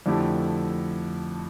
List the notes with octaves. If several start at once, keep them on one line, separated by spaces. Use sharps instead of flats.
F2 D3 A3 E4 G4